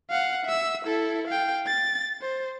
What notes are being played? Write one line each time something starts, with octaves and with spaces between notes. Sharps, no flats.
F5 F#5
E5 E6
E4 A4
F5 G5
A6
C5